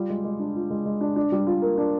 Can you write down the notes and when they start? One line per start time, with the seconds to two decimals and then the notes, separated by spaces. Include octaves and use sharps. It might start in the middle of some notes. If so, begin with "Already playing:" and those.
Already playing: G3 F4
0.10 G#3
0.24 G#3
0.39 D4
0.56 F4
0.70 G#3
0.85 G#3
1.01 D4
1.16 D4
1.32 G3
1.47 F4
1.62 A#3
1.77 D4